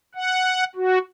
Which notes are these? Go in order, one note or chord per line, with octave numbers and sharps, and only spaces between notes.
F#5
F#4